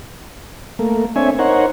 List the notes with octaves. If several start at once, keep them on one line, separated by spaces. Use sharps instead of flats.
A3 A#3
C4 D4 C#5 E5 G#5
D#4 A#4 C5 C#5 F#5